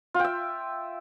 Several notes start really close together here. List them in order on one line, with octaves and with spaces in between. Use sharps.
F4 G5 E5